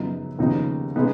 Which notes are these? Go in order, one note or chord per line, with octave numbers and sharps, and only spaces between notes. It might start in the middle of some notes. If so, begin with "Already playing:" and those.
Already playing: F#2 C#3 F3 B3 D#4
D#2 C#3 F3 B3 D#4
C#3 G#3 B3 D#4